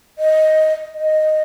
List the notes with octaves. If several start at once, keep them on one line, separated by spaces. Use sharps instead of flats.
D#5
D#5